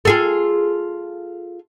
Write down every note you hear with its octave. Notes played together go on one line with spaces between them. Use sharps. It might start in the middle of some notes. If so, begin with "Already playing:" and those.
F4 G#4 A4